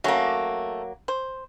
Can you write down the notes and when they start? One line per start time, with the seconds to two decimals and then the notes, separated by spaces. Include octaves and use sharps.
0.04 F#3 A3 A#3 C#4
1.08 C5